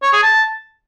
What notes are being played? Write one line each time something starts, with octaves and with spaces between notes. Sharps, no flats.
C#5
G#4
A5